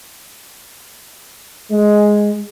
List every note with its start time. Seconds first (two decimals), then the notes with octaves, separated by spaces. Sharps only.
1.72 G#3